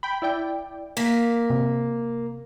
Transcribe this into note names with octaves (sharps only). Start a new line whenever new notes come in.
G5 B5
E4 D5 G5
A#3 B6
C3